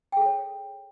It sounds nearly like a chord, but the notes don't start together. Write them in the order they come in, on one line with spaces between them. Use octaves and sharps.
G5 G#4 A4 C#5